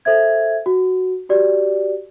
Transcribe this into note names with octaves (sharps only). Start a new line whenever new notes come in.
A4 C5 E5 G#6
F#4
F#4 G4 D5